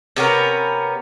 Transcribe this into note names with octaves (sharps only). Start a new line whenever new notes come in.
C3 B3 C#4 A#4